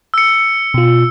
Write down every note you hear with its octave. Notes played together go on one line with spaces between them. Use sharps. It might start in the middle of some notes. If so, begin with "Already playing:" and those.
E6 C#7
B2 F4